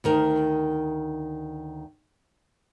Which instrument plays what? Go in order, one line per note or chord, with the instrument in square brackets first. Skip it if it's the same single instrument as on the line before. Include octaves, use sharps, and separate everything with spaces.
[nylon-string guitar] D2 D#3 A#4